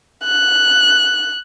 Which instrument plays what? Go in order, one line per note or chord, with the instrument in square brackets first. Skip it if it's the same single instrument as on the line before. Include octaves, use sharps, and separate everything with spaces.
[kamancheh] F#6